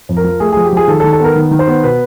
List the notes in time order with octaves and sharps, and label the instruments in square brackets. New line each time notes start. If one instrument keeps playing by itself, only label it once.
[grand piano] F2
A#4
F3
A3 G#4
F3 G#4
G4
F3 G#4
D#3 A4
A4
D#3
A4
B3 A#4
D#3
D#3
C5
B3
B2 B4